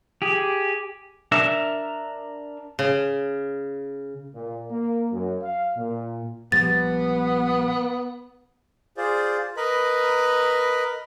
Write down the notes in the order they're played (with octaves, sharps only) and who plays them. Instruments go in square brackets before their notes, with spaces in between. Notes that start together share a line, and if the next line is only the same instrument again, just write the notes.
[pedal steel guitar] G4 G#4
[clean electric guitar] D4 A#4 E5
[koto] C#3
[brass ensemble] A#2
A#3
F#2
F5
A#2
[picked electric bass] A#1 F3 G3 [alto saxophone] B3 [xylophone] A6
[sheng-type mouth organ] F4 G#4 C5 D5
A#4 B4 D#5 B5